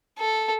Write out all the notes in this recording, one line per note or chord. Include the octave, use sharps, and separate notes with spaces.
A4